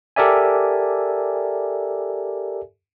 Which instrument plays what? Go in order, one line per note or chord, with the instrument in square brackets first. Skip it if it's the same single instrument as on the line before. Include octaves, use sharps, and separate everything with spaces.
[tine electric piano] G4 A4 A#4 D5 E5 G#5